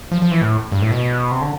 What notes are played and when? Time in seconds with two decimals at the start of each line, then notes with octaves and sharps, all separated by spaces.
0.12 F3
0.22 F3
0.31 E3
0.42 A2
0.72 G2
0.82 A2
0.91 B2
1.31 C3
1.41 D3